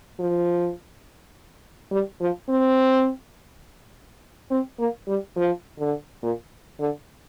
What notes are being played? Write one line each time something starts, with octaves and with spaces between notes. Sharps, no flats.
F3
G3
F3
C4
C4
A#3
G3
F3
D3
A#2
D3